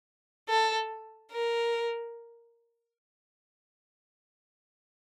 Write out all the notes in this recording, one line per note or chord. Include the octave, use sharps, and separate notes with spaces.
A4
A#4